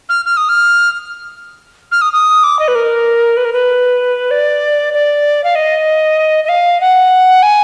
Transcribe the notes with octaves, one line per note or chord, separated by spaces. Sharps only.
F6
F6
D#6
F6
F6
D#6
D#6
D6
D#5
B4
A#4
B4
A#4
B4
D5
D5
F5
D#5
D#5
F5
F#5
G#5